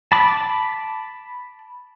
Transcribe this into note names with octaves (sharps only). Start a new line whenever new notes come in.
A5 B5 D6